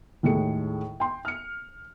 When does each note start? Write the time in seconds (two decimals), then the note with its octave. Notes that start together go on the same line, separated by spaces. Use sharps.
0.23 D#2 A2 G#3 A3 G#4 C#7
1.00 G5 C6
1.25 F6 C#7